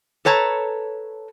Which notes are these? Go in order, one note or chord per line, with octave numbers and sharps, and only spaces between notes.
A4 B4 C#5 A5 A#5